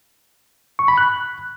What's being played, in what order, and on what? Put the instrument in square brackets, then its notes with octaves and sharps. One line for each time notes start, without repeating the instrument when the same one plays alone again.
[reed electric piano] C#6
B5
F#6